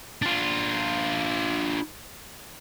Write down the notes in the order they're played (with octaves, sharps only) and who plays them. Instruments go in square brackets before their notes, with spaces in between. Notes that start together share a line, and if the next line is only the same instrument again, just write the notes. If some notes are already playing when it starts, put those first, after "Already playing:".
[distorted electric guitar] D4 F4